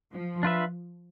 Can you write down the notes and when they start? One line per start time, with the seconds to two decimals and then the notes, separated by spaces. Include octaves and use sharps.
0.13 F3
0.43 D4 F4 B4 E5